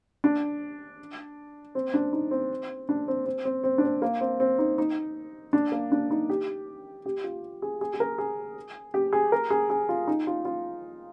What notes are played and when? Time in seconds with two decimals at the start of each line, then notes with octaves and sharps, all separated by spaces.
0.24 D4
1.75 C4
1.94 D4
2.13 D#4
2.31 C4
2.89 D4
3.08 C4
3.26 C4
3.45 C4
3.64 C4
3.78 D4
3.84 C4
4.02 A#3
4.21 C4
4.40 C4
4.59 D#4
4.78 D#4
5.53 D4
5.72 A#3
5.92 D4
6.11 D#4
6.30 G4
7.06 G4
7.24 F4
7.62 G#4
7.81 G#4
7.94 G#4
8.00 A#4
8.18 G#4
8.94 G4
9.13 G#4
9.32 A#4
9.50 G#4
9.70 G#4
9.89 F4
10.08 D#4
10.27 F4
10.45 F4